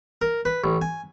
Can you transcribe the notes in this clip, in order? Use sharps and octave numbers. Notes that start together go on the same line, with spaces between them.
A#4
B4
A1
G#5